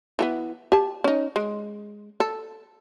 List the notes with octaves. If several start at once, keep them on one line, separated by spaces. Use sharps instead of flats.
E3 A3 B3
G4 A5
C#4 D#4
G#3
A4